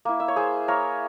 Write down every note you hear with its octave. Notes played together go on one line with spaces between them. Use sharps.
A#3 E4
E5
C#5
G#4 C5
A#3 E4 A#4 C#5